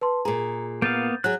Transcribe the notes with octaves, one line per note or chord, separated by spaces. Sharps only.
B4 A5 C6
A#2 G#4 A#5
A#3 B3 F5 G6 A6
F#3 G#4 F#6